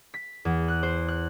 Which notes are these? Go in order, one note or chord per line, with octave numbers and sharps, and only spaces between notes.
B6
E2
F#6
C5
F#6